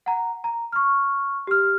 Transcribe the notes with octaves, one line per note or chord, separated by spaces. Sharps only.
F#5 A#5
A#5
C#6 F6
G4 F6